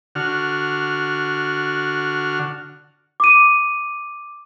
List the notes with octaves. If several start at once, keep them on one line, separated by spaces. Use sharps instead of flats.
D3 F#4 F6
D6 D#7